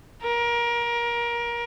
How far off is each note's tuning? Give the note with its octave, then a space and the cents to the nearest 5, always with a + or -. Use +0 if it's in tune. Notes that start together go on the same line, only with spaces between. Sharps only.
A#4 +25